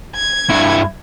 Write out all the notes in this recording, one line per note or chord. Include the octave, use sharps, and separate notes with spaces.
G#6
G2 E4